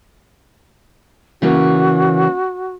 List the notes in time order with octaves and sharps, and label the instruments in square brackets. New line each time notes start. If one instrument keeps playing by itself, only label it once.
[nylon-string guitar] C#3 E3 A#3 [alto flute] F#4